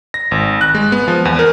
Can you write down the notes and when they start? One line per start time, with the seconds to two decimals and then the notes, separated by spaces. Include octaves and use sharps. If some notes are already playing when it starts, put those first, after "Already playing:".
0.14 A#6
0.31 G#1
0.61 F#6
0.75 G#3
0.92 B3
1.08 F3
1.25 E2
1.39 A#4